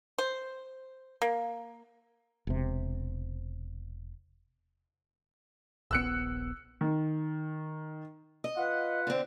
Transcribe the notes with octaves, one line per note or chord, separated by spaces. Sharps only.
C5
A#3
E1 C3
D#1 A#1 B3 E6 F#6 C#7
D#3
D#5
F4 B4 F#5
D3 C4